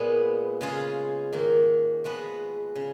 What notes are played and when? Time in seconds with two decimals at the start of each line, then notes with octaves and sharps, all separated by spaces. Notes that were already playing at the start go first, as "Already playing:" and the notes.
Already playing: A#2 G#3 B3
0.61 C#3 G#3 C#4 F4 G#4
1.33 G#2 D#3 A#3
2.04 F3 G#3 B3 F#4 B4
2.75 C#3